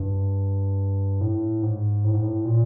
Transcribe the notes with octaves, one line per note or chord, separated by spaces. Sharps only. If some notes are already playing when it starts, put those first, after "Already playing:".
Already playing: G2
A2
G#2
A2
G#2
A2
A#2